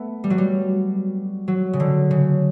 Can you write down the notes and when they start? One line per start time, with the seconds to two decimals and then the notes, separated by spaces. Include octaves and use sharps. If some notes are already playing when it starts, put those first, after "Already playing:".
Already playing: A3 B3
0.24 G3
0.30 F#3
0.38 G3
1.48 F#3
1.73 C#3
1.80 D3
2.11 C#3